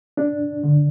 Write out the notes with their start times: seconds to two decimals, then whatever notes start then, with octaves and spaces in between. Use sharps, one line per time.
0.17 D4
0.63 D3